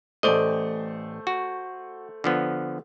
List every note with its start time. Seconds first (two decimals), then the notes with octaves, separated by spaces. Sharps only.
0.23 A1 A3 C5 D5 D#5 G7
1.27 F#4
2.24 D3 F3 B3